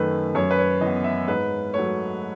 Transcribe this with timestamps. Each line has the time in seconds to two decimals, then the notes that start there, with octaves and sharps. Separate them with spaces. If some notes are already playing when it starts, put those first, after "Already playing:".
Already playing: F#2 D#3 A3 B4
0.35 F#2 C#5
0.51 B4
0.59 C#5
0.81 E3 D#5
0.86 B3
1.04 E5
1.28 G#2 B4
1.74 F#3 A3 C#5